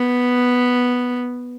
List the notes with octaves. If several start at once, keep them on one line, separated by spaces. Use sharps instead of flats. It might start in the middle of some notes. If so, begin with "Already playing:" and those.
Already playing: B3